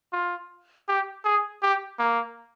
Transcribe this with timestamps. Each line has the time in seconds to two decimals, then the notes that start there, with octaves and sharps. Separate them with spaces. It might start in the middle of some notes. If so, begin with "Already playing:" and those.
0.13 F4
0.88 G4
1.25 G#4
1.62 G4
1.99 A#3